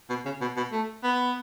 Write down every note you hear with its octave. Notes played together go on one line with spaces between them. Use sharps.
B2
C#3
B2
B2
A3
B3